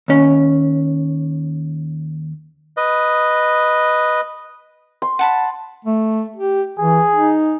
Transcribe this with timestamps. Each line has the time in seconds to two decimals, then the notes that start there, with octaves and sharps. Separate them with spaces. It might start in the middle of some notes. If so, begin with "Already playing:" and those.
0.08 D#2 C#4
2.77 B4 D#5
5.02 C6
5.19 F#5 A5 B5
5.85 A3
6.36 G4
6.79 E3 G#4
7.13 D#4